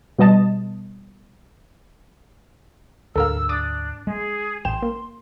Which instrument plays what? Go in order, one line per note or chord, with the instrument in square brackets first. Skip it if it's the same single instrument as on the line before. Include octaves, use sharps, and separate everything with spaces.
[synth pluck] B2 G3 B3 D#5 A5
[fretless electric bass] D2 G#2 [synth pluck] A4 A#4 F5 [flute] E6
[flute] D4 [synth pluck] D6 D#6 A6
[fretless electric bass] G#3 [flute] G#4
[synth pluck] A1 G5 E7 [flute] C6
[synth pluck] A#3